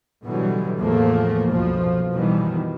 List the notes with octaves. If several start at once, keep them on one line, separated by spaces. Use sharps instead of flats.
B2 D3 E3 F#3 G3
E2 A2 F3 A3 A#3
C2 F#2 B2 F3
B2 D#3 E3 G3